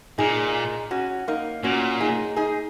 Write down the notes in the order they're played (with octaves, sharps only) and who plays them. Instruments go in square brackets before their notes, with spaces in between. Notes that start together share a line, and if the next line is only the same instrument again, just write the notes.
[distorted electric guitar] A#2 [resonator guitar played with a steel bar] D#4 G#4
[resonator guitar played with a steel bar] C#4 F#4
A#3 D#4
[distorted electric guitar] A#2 [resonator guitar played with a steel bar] C#4 F#4
[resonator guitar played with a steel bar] D#4 G#4
D#4 G#4